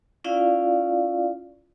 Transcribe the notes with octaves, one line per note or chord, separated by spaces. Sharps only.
C#4 E4 F4 D5 F5